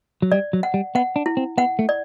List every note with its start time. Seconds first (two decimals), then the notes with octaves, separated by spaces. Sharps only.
0.22 F#3
0.32 G3 D5
0.53 F#3
0.63 F#5
0.74 G3
0.95 B3 F#5
1.16 D4
1.26 E4
1.37 C4
1.58 B3 F#5
1.79 A3
1.89 D5